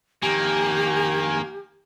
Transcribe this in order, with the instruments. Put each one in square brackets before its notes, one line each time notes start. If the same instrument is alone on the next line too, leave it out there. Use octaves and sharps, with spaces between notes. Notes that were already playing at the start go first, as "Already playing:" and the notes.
[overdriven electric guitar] F2 D#3 [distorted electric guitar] A#3 [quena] G4 [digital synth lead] G#5